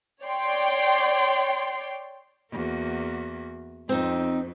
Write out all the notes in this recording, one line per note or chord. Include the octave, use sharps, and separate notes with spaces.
C#5 D5 G5 C6
E2 A#3 F#4
F2 C4 D#4